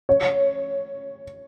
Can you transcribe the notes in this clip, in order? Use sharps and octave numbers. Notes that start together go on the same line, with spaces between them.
C#5